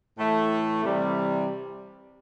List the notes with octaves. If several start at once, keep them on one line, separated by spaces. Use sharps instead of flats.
A2 E3 A3
C3 E3 G3